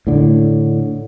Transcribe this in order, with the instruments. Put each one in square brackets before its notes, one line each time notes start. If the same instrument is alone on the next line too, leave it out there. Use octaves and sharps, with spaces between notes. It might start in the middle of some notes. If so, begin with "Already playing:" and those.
[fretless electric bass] A2 D3